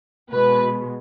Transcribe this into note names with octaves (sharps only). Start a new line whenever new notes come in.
B2 G#3 B4